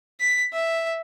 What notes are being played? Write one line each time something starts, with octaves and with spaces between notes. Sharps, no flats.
B6
E5